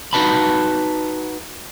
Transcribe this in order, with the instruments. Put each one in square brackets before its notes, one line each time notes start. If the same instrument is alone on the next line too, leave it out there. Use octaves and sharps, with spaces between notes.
[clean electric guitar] D#4 F4 F#4 B4 A5 B5